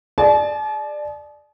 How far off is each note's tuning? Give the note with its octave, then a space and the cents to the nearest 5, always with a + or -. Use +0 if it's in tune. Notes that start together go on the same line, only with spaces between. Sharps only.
G#4 +0 D5 +20 A5 -45